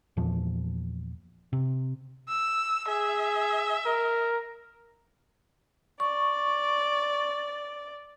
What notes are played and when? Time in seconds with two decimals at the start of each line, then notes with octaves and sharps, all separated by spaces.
0.17 E2 A#2 F3
1.53 C3
2.29 E6
2.88 G#4 E5
3.86 A#4
6.00 D5 C#6